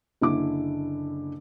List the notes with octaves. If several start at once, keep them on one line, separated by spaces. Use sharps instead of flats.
F#1 D3 E4 D6